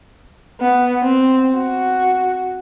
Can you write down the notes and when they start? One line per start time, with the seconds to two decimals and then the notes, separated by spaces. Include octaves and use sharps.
0.60 B3
1.02 C4
1.54 F#4